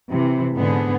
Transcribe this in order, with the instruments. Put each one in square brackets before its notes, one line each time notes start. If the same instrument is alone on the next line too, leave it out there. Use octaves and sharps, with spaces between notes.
[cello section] C3 E3
G#2 D3 B3 G#4